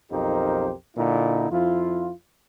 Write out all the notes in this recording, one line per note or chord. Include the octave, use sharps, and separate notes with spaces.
B1 F2 D#4 G4 A#4 C5
A#2 D3 A#3 D#4 E4
F2 F3 E4 F4